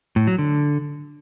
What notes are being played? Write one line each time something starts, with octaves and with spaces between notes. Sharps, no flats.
A2
F#3
D3